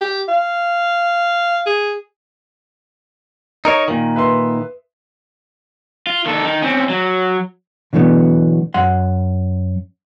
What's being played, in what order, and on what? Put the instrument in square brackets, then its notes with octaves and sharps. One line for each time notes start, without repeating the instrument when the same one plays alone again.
[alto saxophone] G4
F5
G#4
[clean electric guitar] D#4 A#4 C#5
A#2 D#3
[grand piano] B4 E5 C6
[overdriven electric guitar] F4
D#3 A4
D#3
C4 C#4
F#3
[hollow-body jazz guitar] B2 D3 E3 F#3 A3 B3
F#2 F#5 C6